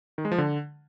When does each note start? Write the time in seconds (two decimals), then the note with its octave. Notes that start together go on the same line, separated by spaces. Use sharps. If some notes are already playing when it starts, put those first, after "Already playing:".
0.18 D#3
0.25 G#3
0.32 F3
0.38 D3